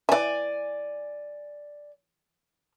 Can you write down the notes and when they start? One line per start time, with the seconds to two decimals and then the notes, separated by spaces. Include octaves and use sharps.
0.09 E3 D5 E5 G#5